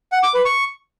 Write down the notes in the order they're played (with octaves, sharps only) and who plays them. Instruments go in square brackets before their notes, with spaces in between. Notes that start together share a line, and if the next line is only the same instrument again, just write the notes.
[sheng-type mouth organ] F#5
D6
B4
C#6